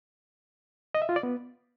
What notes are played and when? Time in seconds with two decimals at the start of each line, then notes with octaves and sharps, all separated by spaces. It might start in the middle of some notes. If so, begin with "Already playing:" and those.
0.95 D#5
1.02 E5
1.09 F4
1.16 D5
1.23 B3